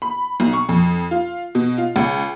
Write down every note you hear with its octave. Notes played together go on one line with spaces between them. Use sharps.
B5
B1
C#6
F2
F4
B2
F4
C#2